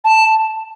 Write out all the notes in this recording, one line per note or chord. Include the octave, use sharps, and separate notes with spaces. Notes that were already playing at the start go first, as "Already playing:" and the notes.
A5